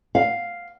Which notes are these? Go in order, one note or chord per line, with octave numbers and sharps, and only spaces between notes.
F5